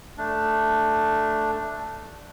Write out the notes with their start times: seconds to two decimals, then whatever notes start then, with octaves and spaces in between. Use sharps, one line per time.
0.18 A3 D4